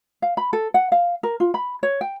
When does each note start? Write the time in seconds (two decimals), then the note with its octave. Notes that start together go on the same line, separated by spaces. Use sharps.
0.22 F5
0.37 B5
0.53 A4
0.74 F#5
0.92 F5
1.23 A#4
1.40 F4
1.54 B5
1.83 C#5
2.01 G5